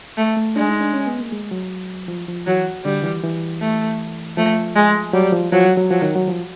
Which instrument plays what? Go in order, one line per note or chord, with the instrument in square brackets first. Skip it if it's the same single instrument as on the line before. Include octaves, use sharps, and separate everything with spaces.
[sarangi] A3
[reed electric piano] A3
[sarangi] G#3 [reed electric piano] D4
[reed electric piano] D#4
D4
C#4
B3
A#3
G#3
F#3
F3
F3
[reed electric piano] E3 [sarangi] F#3
[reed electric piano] D3 [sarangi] G3
[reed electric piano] E3
E3
[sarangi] A3
[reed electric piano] F3 [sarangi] A3
[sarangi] G#3
[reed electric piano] F#3 [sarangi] G3
[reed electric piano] F3
[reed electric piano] F3 [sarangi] F#3
[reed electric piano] F#3
F#3
[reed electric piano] F3 [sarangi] F#3
[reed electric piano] D#3
F#3
F3